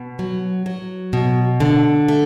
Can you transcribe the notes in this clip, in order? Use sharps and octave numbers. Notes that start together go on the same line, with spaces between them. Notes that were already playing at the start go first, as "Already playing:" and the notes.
Already playing: B2
F#3
F#3
B2
D3
A3